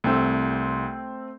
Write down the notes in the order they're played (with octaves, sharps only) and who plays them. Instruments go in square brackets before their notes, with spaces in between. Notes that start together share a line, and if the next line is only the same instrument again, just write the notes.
[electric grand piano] C2 E6 [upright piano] A3 C4